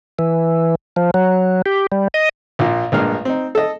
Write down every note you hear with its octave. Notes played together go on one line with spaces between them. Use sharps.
E3
F3
F#3
G4
G3
D#5
A#1 A#2
A#1 G2 G#3 A#3 F6
C4 D#4
A4 D#5